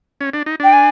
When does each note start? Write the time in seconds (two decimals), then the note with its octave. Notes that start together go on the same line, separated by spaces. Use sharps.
0.21 C#4
0.33 D4
0.46 D#4
0.60 D4 G5
0.73 G#5